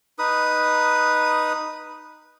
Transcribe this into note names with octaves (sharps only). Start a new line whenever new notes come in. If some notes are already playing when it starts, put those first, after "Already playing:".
D#4 B4 D#6